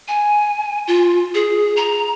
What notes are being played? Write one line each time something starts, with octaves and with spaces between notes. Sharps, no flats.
G#5
F4
G#4
A#5